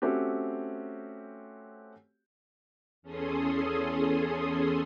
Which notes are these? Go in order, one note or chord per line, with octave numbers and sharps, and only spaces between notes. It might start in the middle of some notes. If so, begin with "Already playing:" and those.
A3 C4 C#4 F#4 G4
E2 C#4 G#4 A4 C6 D#6